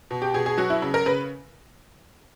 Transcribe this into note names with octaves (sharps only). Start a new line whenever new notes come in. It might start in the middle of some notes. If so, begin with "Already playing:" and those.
B2
G4
B2 G#4
G#4
F#3 F#4
E4
C#3
A#4
C#3 B4